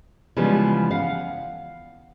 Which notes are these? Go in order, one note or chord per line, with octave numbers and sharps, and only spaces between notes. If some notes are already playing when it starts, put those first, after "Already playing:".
C#3 E3 F3 G3 G#3 B3
F5 F#5